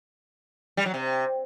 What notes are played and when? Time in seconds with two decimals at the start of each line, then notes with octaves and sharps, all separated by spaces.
0.77 G3
0.86 F#3
0.94 C3